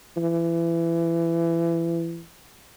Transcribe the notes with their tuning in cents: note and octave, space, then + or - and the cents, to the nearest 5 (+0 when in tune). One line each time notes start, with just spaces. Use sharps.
E3 +25